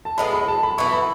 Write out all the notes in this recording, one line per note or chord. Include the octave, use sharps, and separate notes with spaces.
A5
A2 G#3 B3 B5
B5
A5
B5
E3 B3 E4 C#6
B5